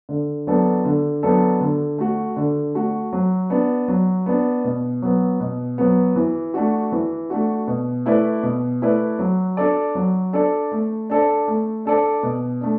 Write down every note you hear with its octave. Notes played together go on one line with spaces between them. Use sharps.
D3
F#3 B3 D4 A4
D3
F#3 B3 D4 A4
D3
A3 F#4
D3
A3 F#4
F#3
B3 D4
F#3
B3 D4
B2
F#3 B3
B2
F#3 B3
E3
A3 D4 F#4
E3
A3 D4 F#4
B2
A3 E4 B4 D5
B2
A3 E4 B4 D5
F#3
D4 A4 D5
F#3
D4 A4 D5
A3
D4 A4 D5
A3
D4 A4 D5
B2
A3 D4